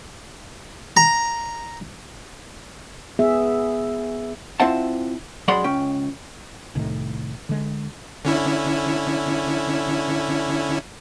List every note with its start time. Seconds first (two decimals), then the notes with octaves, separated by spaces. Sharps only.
0.97 A#5
3.19 B3 G#4 E5
4.60 C4 E4 F4 E5 F#5 A5
5.48 F#2 G#3 D5 F#5 B5 C6
5.64 C#2 C#4 G5
6.75 C2 A2 D#3
7.49 D3 G#3
8.25 D3 C#4 E4